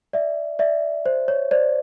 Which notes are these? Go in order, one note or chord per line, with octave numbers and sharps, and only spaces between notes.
D5 E5
D5 E5
C5
C#5
C5 D5